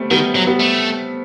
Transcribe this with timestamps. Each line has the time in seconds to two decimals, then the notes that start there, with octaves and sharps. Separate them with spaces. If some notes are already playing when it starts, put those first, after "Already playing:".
Already playing: G3 A3 B3 C4
0.11 D#3 G3 B3
0.35 F#3
0.47 G3 B3
0.60 A3